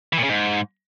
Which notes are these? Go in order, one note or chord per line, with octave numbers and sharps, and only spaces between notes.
E3
A#2
C#3
G#2